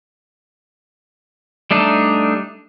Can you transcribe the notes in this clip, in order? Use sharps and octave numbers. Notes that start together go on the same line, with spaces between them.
G3 A3 D4 D#4